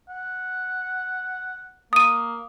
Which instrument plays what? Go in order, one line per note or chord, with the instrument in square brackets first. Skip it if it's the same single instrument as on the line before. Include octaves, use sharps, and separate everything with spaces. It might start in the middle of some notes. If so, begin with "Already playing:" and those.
[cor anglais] F#5
[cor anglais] A#3 [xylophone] D#6 D#7